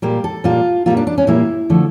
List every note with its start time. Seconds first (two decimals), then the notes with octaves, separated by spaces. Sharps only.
0.02 A#2 G3 A#3 G4
0.24 A4
0.44 A#2 G3 A#3 F4
0.86 A#2 G3 A#3 F4
0.97 D4
1.07 D4
1.18 C#4
1.27 A#2 G3 A#3 E4
1.70 D3 F3 A3